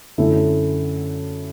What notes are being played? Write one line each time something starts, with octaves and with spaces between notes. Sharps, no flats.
F#2 D3 A3 E4 A4